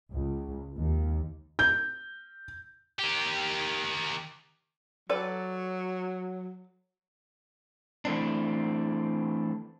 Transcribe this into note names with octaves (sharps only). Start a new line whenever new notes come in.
C#2
D#2
G6
D#3 G4
F#3 A4 B4 D5
E3 A3 C4 D4